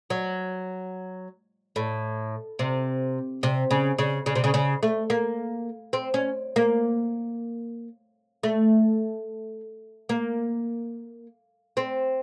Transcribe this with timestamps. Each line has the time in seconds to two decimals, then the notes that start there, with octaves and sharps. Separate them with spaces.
0.10 F#3
1.76 A2
2.59 C3
3.43 C3
3.71 C#3
3.99 C#3
4.26 C#3
4.35 C3
4.44 C#3
4.54 C#3
4.83 A3
5.10 A#3
5.93 C4
6.14 C#4
6.56 A#3
8.43 A3
10.09 A#3
11.77 C4